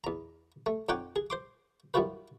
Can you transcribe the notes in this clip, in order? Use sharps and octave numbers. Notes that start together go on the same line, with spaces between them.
E2 A#5
A3
F2 D#4 C#5 F#5 G5 D6
G#4
C5 C6 D6
F#2 E3 G3 F4 F#4 B4